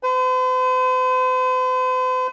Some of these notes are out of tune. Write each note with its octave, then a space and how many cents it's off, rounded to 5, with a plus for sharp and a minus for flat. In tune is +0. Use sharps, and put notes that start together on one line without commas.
C5 -45